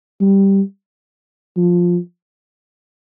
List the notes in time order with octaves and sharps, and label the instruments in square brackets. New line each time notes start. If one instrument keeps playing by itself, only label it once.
[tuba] G3
F3